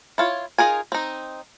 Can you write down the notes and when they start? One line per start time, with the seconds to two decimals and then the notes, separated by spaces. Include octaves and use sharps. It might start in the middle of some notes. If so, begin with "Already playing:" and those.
0.18 E4 F4 C#5
0.58 D#4 F4 G#4 A#4 G#5
0.92 C4 D#4